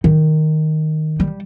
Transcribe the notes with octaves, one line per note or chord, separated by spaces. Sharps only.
D#3
G3